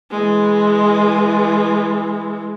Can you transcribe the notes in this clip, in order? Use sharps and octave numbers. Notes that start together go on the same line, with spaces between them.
E3 G#3